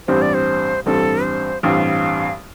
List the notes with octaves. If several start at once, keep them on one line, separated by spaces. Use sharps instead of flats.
A1 G2 G3 C4 C5
D5
C5
A1 G2 G3 C4 A4
C5
A1 G2 G3 C4 F5